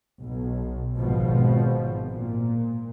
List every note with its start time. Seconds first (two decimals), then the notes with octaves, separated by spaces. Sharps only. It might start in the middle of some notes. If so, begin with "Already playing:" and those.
0.19 B1
0.97 G#1 B2 F3
2.09 A#2